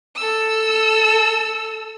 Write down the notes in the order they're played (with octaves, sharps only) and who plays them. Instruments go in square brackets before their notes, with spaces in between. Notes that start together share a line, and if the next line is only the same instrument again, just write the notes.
[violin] A4 E6